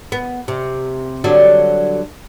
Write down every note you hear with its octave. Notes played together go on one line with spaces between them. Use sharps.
B3
C3
D3 F#3 G3